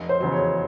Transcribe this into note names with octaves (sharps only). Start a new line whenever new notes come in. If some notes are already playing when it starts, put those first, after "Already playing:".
Already playing: F1
C5
E2 C#3 F#3
C#5